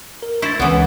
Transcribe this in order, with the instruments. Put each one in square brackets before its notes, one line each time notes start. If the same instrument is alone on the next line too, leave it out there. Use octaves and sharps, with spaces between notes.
[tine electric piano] A#4
[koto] E4 C5 [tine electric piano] C#6 A6
[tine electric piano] C#2 C#4 [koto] E3 B3